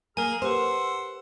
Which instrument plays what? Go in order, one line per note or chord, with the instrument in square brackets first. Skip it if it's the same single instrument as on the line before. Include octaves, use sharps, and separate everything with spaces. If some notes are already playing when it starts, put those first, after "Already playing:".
[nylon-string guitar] A#3 [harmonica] G#4 A#5 F6 [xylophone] A#4 G#5
[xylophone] G4 B4 [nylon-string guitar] C5 [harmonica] F#5 C6 E6